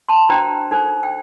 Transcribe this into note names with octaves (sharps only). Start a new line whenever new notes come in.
A5 C6
D4 F#4 C5 G5 A#5
D#4 A4 C5
G5